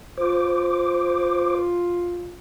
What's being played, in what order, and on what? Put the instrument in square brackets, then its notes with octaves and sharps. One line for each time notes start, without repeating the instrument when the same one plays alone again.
[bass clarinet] F4 [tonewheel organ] C5 D6